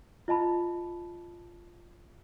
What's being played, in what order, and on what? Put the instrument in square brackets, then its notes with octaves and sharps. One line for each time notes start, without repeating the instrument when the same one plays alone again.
[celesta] F4 D#5 A5 B5